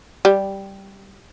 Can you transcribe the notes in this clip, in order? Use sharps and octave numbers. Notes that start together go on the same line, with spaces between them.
G3